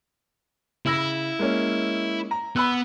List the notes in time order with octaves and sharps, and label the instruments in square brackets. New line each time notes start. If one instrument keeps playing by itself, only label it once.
[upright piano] C#3 E6 A#6 [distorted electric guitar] E4
[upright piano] G#3 A#3 C#4
A#5
[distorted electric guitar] B3 [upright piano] B5 E6 F#6